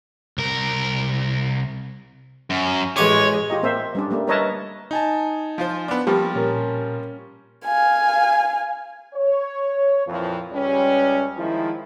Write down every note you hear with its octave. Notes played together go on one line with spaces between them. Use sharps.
C2 A#4
F#2
A1 G#3 C#5 B5 D6
F4 G4 D#5
A#3 C4 C5 E5
G3 C#4 D4
G3 A3 A#3
A#4 B4 C#5 D#5 E5 A5
D#4 G#5 A5
F3 F4 C5
B3 D4
F3 G3 A#3 C4 G4
A#2 C#4 A#4
F5 G#5
C#5
F2 A#2 E3 F3
C#2 G3 C#4
D#3 F3 G#3 E4